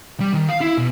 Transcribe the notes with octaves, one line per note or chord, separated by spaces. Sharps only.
G3
D#3
F5
E4
B2